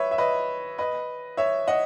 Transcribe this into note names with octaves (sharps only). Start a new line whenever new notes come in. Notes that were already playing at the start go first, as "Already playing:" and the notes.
Already playing: B4 C#5 E5
E5
B4 D#5
B4 D#5
C#5 E5
D#5 F#5